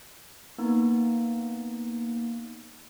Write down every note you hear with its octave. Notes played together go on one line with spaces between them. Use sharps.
A#3 B3 D#4